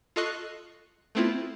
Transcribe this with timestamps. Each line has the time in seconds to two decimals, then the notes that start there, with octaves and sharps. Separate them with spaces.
0.16 F4 A4 D#5 C#6 F#6 C7
1.15 A3 B3 C4 E4 F4